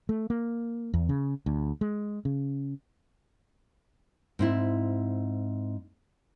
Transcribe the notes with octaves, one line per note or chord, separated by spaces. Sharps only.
A3
A#3
E2
C#3
D2
G#3
C#3
G#2 C4 E4